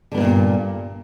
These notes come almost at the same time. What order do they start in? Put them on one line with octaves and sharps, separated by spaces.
D3 B3 A#3 A#2 G2